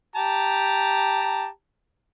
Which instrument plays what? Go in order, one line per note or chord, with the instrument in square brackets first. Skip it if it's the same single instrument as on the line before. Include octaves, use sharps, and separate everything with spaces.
[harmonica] G4 A5 A#5